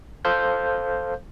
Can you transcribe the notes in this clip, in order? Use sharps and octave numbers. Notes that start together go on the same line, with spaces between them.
A4 C5 F5 G6